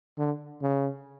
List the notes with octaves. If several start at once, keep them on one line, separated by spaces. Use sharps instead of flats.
D3
C#3